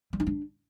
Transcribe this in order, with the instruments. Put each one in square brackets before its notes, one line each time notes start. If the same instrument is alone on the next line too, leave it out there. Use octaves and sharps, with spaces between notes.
[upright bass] G3
D#4
D4